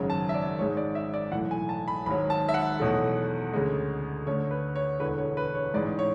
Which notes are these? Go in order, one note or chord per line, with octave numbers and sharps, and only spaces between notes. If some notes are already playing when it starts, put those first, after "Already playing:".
Already playing: G#1 F#2 C#3 F#3
A5
E5
D5
G#1 G#2 G#3 C#5
D5
E5
D5
B1 A2 E3 F#5
G#5
A5
B5
G#1 G#2 F#3 B5
A5
E5
F#5
E2 B2 F#3 A3
D2 C#3 G#3
D2 D3 A3 C#5
B4
C#5
E1 E2 D3 B4
C#5
B4
C#5
A1 G#2 G#3 D5
C#5